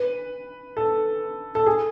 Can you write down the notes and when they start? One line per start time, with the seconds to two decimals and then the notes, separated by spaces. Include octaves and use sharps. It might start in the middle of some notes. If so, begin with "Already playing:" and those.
Already playing: B4
0.77 A4
1.55 A4
1.66 G#4